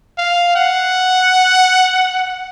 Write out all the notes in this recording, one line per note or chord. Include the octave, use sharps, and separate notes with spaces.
F5
F#5